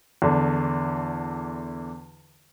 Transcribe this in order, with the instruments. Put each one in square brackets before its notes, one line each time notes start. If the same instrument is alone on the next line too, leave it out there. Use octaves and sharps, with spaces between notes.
[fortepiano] E2 D3